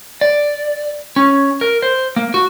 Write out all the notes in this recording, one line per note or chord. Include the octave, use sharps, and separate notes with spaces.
D5
C#4
A#4
C5
A#3
F#4